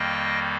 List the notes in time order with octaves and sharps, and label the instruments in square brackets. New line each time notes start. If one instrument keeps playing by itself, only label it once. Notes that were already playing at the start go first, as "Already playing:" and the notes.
Already playing: [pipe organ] F2 D#3 G3 A#3 D#5 G5